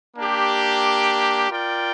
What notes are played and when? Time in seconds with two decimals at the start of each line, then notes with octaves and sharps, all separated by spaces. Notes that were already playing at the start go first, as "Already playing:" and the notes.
0.17 A#3 D4 G4
1.51 F4 A#4 D5 G5